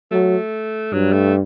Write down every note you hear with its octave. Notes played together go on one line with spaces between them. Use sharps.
F#3 A3
G2 F#3
A3